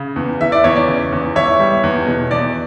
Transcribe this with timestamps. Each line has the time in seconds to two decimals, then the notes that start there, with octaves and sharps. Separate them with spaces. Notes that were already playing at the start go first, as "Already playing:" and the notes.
Already playing: C#3
0.16 E2
0.40 E3 E5
0.52 D5
0.64 E2 C#5
0.76 D5
0.88 C#3
1.12 E2
1.35 E2 C#5 E5
1.59 G3
1.83 E2
2.07 B2
2.31 E2 D5